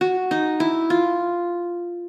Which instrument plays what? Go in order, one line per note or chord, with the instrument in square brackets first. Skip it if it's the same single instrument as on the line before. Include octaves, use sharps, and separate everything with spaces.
[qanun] F#4
D#4
E4
F4